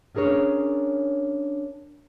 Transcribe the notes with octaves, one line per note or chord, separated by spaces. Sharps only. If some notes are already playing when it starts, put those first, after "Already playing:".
C#4 D4 G#4 A#4 C#5